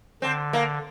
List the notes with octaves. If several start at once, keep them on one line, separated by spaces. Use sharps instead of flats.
D3 C4
A#3